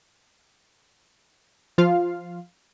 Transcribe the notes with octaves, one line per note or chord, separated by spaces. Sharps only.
F3 F4 F5